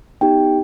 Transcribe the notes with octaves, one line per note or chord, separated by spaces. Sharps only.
B3 D#4 G4 G5